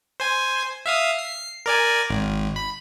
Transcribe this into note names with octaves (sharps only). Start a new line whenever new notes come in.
C5 G#5
E5 F5 D#6
C7
A#4 D5 G#5
G#1
B5